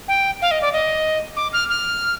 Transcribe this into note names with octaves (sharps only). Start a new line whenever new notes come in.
G5
F5
D#5
D5
D#5
D6
F6
F6